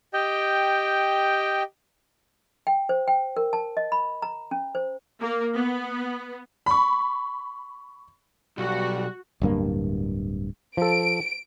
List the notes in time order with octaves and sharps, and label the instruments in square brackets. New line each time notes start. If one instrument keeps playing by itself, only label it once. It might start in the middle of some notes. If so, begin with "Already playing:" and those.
[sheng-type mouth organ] G4 D#5 G5
[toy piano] G5
C5
G5
A#4
A5
D#5
B5
A#5
C#4
C5
[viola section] A#3
B3
[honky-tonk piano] B5 C#6
[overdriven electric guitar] B1 [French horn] G3 [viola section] F#4
[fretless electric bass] D1 G2 A#3
[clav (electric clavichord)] F3 A4 [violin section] D7